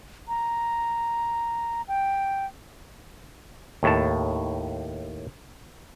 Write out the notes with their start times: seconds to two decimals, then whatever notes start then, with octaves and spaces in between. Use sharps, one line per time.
0.28 A#5
1.88 G5
3.83 D#2 A2 A5